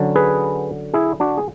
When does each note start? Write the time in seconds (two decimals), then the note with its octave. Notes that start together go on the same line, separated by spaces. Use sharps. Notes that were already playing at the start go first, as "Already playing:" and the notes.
Already playing: D3 F#3 C#4
0.16 G#4 B4
0.94 E4 G#4
1.20 D4 F#4
1.37 G#4